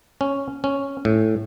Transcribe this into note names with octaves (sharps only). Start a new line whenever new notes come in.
C#4
C#4
A2